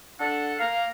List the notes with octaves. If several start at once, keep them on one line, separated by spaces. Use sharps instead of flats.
D4 A4 F#5
A#3 A#4 F5